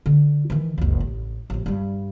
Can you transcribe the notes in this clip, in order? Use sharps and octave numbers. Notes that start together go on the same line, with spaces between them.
D3
D#3 E3
F#1 C#2
A1
A1 F3
G2 G3